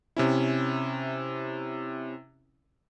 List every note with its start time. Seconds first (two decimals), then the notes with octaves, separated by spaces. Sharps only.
0.17 C3 C#4 E4